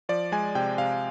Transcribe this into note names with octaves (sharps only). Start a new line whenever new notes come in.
F3 D5
G#3 G#5
C3 G5
C3 F5